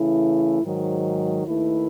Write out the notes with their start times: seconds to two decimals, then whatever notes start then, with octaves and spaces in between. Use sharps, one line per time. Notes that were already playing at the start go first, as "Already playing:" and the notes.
Already playing: C#3 E3 A3 E4
0.62 G#2 D#3 F#3
1.44 D#2 D#3 A3 E4 B4